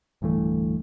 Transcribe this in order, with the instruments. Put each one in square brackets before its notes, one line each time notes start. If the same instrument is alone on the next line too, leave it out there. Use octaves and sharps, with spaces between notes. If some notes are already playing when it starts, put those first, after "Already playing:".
[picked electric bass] D1 G2 E3 A3